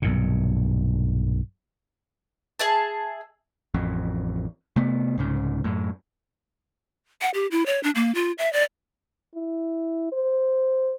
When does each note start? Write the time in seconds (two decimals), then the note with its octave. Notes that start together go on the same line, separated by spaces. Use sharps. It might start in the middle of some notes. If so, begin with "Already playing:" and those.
0.02 B1 G2 A#2
2.59 G#4 E5 A5
3.74 A1 F2
4.76 C3 A3 B3
5.18 C2 G#2 C#3
5.64 F#2 A2
7.21 F#5
7.34 G4
7.51 E4
7.66 C#5
7.83 D4
7.95 A#3
8.15 F4
8.39 E5
8.53 D5
9.35 E4
10.12 C5